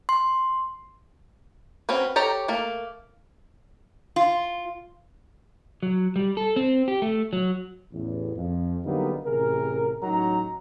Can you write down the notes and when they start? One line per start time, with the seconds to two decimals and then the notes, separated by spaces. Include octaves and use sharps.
0.09 C6
1.89 C4 C#4 F#4 B4
2.16 G4 A4 C#5 A#5
2.48 A3 A#3
4.16 F4
5.83 F#3
6.16 G3
6.37 A4
6.56 C4
6.88 G4
7.02 A3
7.33 F#3
7.92 A1 E2
8.35 F2
8.84 D3 F#3 G3 A#3 B3 D#4
9.25 A1 C3 G#4 A#4
10.03 A1 F#3 D#4 A#5